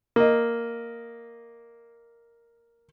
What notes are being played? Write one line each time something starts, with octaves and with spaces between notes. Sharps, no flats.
A#3 D#5